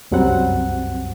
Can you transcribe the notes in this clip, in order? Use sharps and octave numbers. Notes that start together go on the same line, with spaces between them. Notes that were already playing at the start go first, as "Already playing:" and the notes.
C2 F#2 F#3 G3 C4 F#5